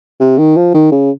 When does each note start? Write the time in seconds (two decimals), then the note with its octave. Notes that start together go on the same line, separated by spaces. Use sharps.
0.20 C3
0.38 D#3
0.56 F3
0.74 D#3
0.92 C#3